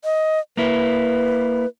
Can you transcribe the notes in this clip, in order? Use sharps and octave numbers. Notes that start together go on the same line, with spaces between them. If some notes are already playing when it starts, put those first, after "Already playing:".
D#5
A#3 E4 B4